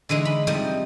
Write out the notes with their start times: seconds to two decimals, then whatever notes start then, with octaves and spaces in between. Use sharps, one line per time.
0.09 D3 E3 G#3 D#4
0.25 B5
0.47 C3 F3 G3 A3 D#4